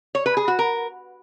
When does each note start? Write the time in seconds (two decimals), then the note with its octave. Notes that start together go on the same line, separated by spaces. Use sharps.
0.15 C#5
0.26 B4
0.37 G#4
0.48 F#4
0.59 A#4